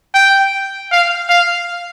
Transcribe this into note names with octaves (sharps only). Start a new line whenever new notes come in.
G5
F5
F5